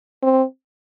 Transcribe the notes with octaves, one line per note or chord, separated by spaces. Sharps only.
C4